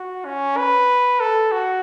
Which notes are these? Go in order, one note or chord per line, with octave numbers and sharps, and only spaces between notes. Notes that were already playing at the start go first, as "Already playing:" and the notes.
Already playing: F#4
C#4
B4
A4
F#4